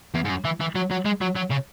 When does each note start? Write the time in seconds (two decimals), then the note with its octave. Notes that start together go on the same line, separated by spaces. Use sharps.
0.14 E2
0.25 G#2
0.29 F#2
0.45 E3
0.61 E3
0.76 F#3
0.91 F#3
1.06 G#3
1.22 F#3
1.36 F#3
1.51 C#3